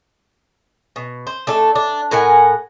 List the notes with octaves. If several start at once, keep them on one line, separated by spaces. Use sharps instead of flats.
B2
C5
A3 D4 A4
D4
A2 A#4 F#5 G#5